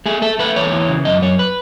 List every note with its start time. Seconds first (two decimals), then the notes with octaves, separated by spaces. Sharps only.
0.06 A3 G#4
0.22 A3 A4
0.39 A3 B4
0.56 E2 C#5
0.72 E3
0.88 C#3
1.05 F#2 D#5
1.22 F#2 C#5
1.39 B4